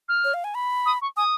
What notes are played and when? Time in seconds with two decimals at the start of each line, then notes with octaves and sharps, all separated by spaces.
0.09 F6
0.24 C#5
0.34 F5
0.44 G#5
0.55 B5
0.86 D#6
1.02 C#6
1.17 G#5 D#6